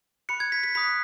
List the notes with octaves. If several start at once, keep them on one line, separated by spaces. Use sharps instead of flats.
B5 F#6 C#7
G#6
B6
B6
B5 D#6 F#6 B6